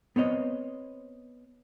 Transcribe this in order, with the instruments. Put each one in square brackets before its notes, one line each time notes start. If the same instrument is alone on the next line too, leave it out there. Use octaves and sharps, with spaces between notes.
[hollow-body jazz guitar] B3 C4 C#5 D#5